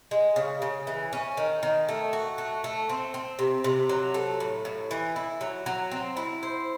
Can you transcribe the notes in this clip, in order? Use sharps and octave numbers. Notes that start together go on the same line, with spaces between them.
G#3
C#3
C#3
E3
C#4
D#3
D#3
A3
F#4
A3
A3
C4
C4
C3
C3
F#3
A3
A2
A2
E3
E4
F#3
F#3
C4
E4
C5